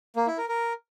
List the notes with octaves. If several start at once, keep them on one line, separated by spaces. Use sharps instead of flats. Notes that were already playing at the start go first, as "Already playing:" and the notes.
A#3
E4
A#4
A#4